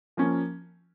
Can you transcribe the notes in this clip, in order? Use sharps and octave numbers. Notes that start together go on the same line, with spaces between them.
F3 A#3 C#4